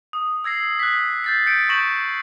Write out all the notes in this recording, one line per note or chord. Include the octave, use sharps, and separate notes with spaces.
D#6
E6 G#6 A#6 C7
F#6 B6
G6 A6 C7
G6 C#7 D7
C#6 G6 A#6 D7 E7 F#7